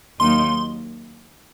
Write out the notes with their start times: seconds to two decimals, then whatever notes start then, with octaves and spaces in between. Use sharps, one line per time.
0.20 D#2 D#3 F#3 A#3 D#4 C6